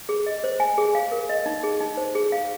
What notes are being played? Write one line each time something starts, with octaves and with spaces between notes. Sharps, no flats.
G#4
D#5
C5
G#5
G#4
F5
A#4
D#5
D#4
G#4
D#4
C5
G#4
F5